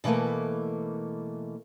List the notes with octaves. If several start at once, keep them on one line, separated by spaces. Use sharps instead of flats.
B2 E3 F#3 A3 A#3